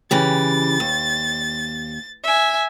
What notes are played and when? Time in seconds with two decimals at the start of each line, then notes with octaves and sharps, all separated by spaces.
0.11 C#3 E3 G4 A6
0.80 D#2
2.24 E5 G#5